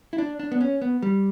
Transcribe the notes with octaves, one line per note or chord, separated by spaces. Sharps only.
E4
D4
D4
B3
C#4
B3
G3